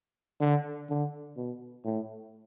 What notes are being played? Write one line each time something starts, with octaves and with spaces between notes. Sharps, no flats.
D3
D3
B2
A2